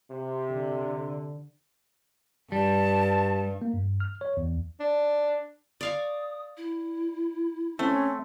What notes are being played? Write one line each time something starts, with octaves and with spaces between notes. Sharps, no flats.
C3
D3
G2 G3 A5
A#3
G2
F6
C#5
E2
D4
D5 F5 C#6 D#6
E4
A3 C4 C#4